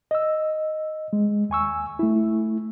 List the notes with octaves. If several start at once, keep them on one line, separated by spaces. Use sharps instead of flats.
D#5 E6
G#3
D#2 G#5 C#6 E6
A3 E4